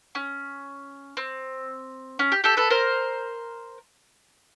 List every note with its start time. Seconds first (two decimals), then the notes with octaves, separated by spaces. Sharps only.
0.15 C#4
1.17 C4
2.19 C#4
2.32 G4
2.44 G4 A4
2.57 A4 B4
2.70 A#4 C5